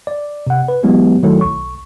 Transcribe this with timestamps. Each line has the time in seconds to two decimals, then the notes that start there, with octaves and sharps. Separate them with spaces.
0.07 D5
0.47 C3 F#5
0.68 B4
0.83 E3 F#3 G#3 B3 E4 G4
1.23 D#3 F#3 A3 E4 A4
1.41 B1 C#6